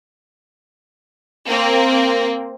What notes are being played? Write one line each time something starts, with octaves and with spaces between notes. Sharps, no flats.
A#3 C4